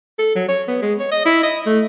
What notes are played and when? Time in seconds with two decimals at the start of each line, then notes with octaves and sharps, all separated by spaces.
0.18 A4
0.36 F#3
0.48 C#5
0.68 B3
0.82 G#3
1.00 C#5
1.11 D#5
1.26 E4
1.43 D#5
1.66 A3